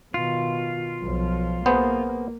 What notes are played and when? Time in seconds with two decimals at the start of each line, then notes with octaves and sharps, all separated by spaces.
0.14 B2 D#3 F4
1.02 B1 F3
1.66 A#3 B3 G#4 C5